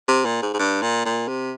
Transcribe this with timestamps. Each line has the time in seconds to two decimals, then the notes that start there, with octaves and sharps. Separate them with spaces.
0.08 C3
0.25 A#2
0.42 G#2
0.54 G#2
0.59 G2
0.82 A#2
1.05 A#2
1.28 C3